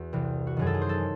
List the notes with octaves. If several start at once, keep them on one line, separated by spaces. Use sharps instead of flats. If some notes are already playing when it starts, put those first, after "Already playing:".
Already playing: E2 F#4 G#4
C2 C3 E3
F#4
F#2 D#3 F#3 G#4
A4
G#4
C5
A4